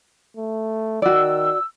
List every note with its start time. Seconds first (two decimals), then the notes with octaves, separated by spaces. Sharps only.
0.37 A3
1.02 D#3 F#4 D5 E6